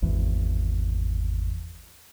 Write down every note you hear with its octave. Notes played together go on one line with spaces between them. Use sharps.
G#1 E2